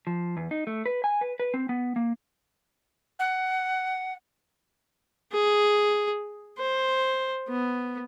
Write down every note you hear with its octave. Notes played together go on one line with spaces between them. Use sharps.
F3
E2
D#4
A3
B4
G#5
B4
B4
C4
B3
A#3
F#5
G#4
C5
B3